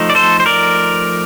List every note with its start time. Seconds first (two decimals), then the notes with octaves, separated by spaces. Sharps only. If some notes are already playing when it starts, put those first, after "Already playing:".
Already playing: F3 A3 D#4
0.10 D5
0.15 A4 C5
0.40 C5
0.46 A#4 D5